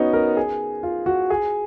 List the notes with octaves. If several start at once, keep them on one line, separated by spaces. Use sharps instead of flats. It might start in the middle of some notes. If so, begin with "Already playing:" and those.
Already playing: B3 C#4 D#4 F#4
A#4
G#4
F4
F#4
G#4